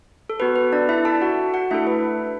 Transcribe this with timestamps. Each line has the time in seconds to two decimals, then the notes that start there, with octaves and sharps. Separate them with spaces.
0.30 A4
0.40 B3 F#4 A4 B4
0.56 B4
0.73 D4 D5
0.89 E4 E5
1.05 A4 A5
1.22 F#4 F#5
1.54 F#4 F#5
1.71 A3 D4 E4 A4 E5
1.87 B4